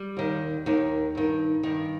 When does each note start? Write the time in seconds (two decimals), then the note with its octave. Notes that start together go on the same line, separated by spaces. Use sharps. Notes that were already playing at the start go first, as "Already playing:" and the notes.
Already playing: G3
0.17 D#2 D#3
0.66 D#2 D#3
1.15 G2 D#3
1.63 G2 D#3